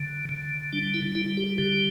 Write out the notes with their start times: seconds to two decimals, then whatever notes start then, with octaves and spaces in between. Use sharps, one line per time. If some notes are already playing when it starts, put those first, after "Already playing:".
Already playing: D3
0.29 D3
0.73 G3 D4
0.94 E4
1.15 G3 E4
1.37 G4
1.58 D3 G4